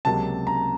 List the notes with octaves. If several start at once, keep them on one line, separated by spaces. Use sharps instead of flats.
C#2 C3 F#3 A#3 A5
A#5